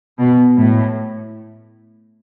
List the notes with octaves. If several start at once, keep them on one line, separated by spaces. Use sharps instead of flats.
B2
A2